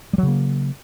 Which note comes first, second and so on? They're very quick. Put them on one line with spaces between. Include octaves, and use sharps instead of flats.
G3 F#3 C#3 A#3